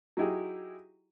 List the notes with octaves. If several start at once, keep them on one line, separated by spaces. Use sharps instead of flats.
F#3 D#4 E4 G4 G#4